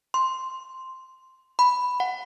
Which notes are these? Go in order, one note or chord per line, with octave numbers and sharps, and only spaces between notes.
C6
B5
F#5